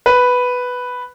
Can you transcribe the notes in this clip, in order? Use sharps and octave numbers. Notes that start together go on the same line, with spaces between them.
B4